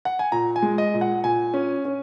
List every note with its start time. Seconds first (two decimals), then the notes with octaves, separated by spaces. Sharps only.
0.05 F#5
0.19 G#5
0.32 A#2 A#5
0.56 G#5
0.62 G#3
0.78 D#5
0.94 A#2
1.01 F#5
1.24 A#2 G#5
1.54 C#4
1.85 C#4